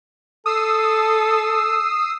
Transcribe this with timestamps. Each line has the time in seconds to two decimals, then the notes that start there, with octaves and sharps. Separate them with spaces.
0.46 A4 D#6 E6 C7